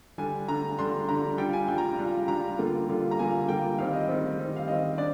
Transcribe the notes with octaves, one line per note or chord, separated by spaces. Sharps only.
D3 G3 D4 G#5
D3 G3 D4 A#5
D3 G3 D4 C6
D3 G3 D4 A#5
G3 D4 F4 G5
G#5
G3 D4 F4 G5
A#5
G3 D4 F4
G3 D4 F4 A#5
D3 G3 A#3 F4
D3 G3 A#3 F4
A#5
D3 G3 A#3 F4 G#5
D3 G3 A#3 F4 G5
D#3 G3 C4 F5
D#5
D#3 G3 C4
D#3 G3 C4
F5
D#3 G3 C4 D#5
D4 D5